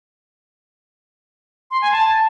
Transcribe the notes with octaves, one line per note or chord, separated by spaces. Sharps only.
C6
G#5
A5